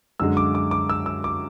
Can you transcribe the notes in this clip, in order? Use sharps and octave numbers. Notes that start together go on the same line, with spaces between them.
F#2 D3 G#3 E6
D6
D6
D6
E6
E6
D6